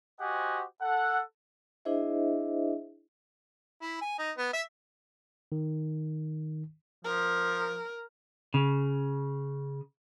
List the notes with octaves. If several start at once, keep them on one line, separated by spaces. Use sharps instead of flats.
F#4 G4 C5 D#5 F#5 G#5
A4 F#5
D4 E4 G#4 C5 D#5 E5
E4
G#5
D#4
B3
E5
D#3
F3 A#4
C#3